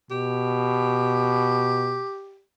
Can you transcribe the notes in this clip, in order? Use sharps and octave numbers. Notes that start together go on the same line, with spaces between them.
B2 G4